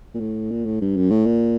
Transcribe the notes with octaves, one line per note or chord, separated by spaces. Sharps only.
A#2
A2
A#2
A2
G2
F#2
A2
A#2